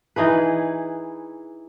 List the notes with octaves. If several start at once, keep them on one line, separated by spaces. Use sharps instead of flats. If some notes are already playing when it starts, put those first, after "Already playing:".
E3 D#4 G#4 B4